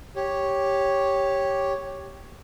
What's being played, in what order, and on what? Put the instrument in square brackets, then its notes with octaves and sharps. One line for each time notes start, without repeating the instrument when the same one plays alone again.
[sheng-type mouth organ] G4 C#5